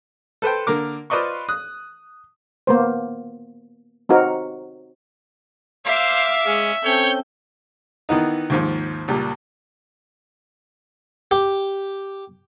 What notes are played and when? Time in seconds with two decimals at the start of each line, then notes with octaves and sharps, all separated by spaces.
0.42 A4 B4 C5 G5
0.67 D3 A#3 A#4 D6
1.10 F4 B4 C5 D5 D#5 C#6
1.49 D#6 F#6
2.67 A#3 B3 C5
4.09 C4 D#4 F#4 A#4
5.86 C5 E5 F5 D6
6.46 G#3 C#4 G#4
6.85 C4 C#4 A4 C#5 G6
8.09 D#3 E3 B3 D#4
8.50 D#2 G#2 F3
9.08 C#2 A#2 G3
11.31 G4